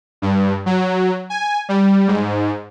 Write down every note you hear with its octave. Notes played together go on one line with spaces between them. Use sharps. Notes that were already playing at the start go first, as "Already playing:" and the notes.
G2
F#3
G#5
G3
G#2